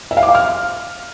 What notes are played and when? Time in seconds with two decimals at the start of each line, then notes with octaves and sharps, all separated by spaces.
0.11 E5
0.17 F5
0.23 D6
0.29 F5
0.35 F6